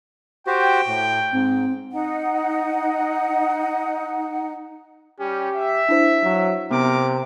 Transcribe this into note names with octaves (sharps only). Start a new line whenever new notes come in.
F#4 G4 C5 G5
A2
G#2 C4
D#4 F#5
G3 C#4 G4
E5
D4 E4 C5
F#3
C3 B3 A#4 D6